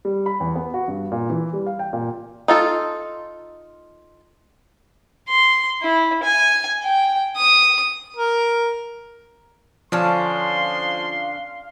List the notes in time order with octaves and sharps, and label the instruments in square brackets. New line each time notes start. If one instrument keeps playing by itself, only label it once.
[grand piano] G3
B5
E2
B3
F#4
G2
A#2
E3
G3
F5
G5
A#2
[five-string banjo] D#4 F4 A4
[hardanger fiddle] C6
E4
G#5
G5
D#6
[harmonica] A#4
[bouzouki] D3 C#4 A5 [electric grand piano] F3 [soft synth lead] F5 [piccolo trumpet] C6